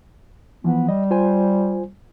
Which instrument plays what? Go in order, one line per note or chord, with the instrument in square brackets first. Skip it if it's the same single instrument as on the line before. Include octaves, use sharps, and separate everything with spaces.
[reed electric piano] E3 F3 [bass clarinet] B3
[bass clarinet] G3 [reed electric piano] D#5
[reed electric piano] F4 C5 G#5